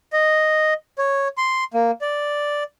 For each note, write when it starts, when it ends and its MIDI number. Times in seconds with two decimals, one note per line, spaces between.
0.13 0.74 75
0.98 1.28 73
1.38 1.64 84
1.74 1.91 58
2.01 2.63 74